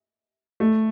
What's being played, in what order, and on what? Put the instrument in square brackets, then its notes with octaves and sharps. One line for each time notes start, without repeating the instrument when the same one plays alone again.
[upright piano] A3